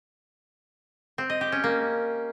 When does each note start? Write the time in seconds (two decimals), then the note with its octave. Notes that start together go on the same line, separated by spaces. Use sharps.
1.18 C4
1.30 D#5
1.41 G4
1.52 C#4
1.64 A#3